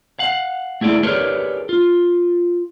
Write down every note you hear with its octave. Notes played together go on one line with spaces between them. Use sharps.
F5 F#5
A3 E4 G#4 D5
G4 G#4 A#4 B4 C#5 D5
F4